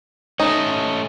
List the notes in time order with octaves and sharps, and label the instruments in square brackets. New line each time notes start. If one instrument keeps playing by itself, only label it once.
[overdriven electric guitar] A3 C#4 [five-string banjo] D#4